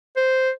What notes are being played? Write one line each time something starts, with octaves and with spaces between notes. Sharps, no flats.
C5